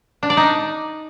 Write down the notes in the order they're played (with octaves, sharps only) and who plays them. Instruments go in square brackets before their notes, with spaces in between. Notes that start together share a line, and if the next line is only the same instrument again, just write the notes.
[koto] D4
D5
D#4